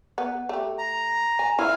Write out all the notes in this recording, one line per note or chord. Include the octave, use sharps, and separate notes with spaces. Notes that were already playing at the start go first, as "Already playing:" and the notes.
B3
A3 G4
A#5
G#5
E4 F5 G#5